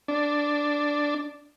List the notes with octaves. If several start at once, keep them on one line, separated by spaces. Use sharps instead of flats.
D4